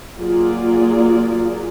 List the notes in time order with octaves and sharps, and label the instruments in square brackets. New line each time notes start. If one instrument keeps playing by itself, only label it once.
[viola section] F#3 A#3 F4 G#4 D5